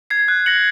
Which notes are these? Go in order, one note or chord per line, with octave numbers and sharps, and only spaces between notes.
G#6 C7
F#6
A#6 C#7 F#7